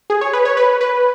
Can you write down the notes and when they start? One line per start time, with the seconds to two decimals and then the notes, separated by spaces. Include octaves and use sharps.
0.10 G#4
0.21 C#5
0.33 B4
0.45 C#5
0.57 B4
0.81 B4